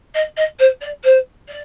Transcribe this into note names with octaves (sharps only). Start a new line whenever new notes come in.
D#5
D#5
C5
D5
C5
D5